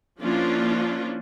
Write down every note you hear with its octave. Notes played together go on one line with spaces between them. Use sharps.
F3 A#3 C#4 D4 E4 F4